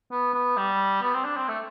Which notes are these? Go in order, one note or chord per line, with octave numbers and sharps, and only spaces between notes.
B3
B3
G3
B3
C4
D4
C4
A3